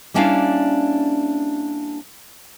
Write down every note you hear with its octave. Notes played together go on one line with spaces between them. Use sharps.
G3 A#3 C#4 D4 E4 F5